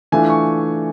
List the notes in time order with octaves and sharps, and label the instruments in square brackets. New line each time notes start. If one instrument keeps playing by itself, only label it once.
[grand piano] E3 A3 D4 F4 G#5
C#6